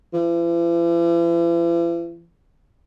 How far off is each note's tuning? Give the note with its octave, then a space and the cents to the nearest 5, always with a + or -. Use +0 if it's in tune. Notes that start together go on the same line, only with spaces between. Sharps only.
E3 +45